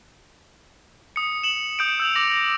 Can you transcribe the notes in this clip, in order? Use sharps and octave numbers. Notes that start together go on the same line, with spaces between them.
D#6 C#7
E7 F#7
D#6 G6 C#7 D7
E6 G6 F7
D6 A#6